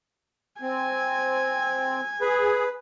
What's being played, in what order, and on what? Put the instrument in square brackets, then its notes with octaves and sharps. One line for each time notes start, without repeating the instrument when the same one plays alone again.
[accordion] C4 [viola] G#5
[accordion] G#4 [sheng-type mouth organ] B4